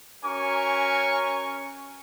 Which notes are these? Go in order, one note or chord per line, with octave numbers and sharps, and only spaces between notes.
C#4 F#4 A#4 C#5 G#5 C#6